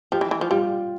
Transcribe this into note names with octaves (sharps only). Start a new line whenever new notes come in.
F3 G4
E3
E3
F3
G3 F4